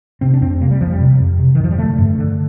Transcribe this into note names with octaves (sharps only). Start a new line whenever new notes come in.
C3 C4
D4
F2 C4
C3 A#3
G3
F2 F3
G3
C3
F2
C3
D#3
F2 F3
G3
D3 A3
G2
D3